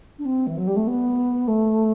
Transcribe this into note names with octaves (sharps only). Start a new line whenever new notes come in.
D4
C4
E3
F#3
G3
A3
B3
A3